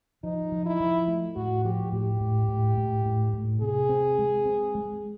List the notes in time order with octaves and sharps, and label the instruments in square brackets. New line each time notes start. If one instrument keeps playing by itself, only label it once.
[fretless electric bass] F3 [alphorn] D#4
[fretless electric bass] F3
[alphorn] E4
[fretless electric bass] F3
A3
[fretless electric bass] A2 [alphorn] F#4
[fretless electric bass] F3 [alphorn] G4
[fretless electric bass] A2 [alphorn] G4
[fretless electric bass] A2
A2
A2
A2
A2
[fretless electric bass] C3 [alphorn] G#4
[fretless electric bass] C4
G#3
C4
G#3